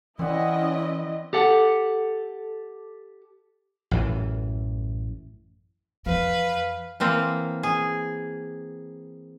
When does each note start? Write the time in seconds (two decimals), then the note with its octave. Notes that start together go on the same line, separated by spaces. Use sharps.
0.19 E3 C4 C#4 E4 D5 D#5 F#5
1.33 G4 A4 F#5
3.91 A1 F#2 E3
6.06 F2 E3 B4 F5
7.00 E3 A#3 C4
7.63 G#4